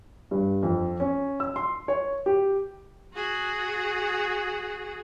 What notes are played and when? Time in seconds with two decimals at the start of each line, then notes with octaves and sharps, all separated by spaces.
0.31 G2
0.63 F2
1.00 C#4
1.40 E6
1.56 C6
1.88 C#5
2.26 G4
3.14 F#4 G#4